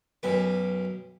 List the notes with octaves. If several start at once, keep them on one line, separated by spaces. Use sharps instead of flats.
B1 F#2 B4